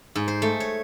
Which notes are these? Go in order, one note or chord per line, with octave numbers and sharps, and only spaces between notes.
G#2
C5
A3
C#5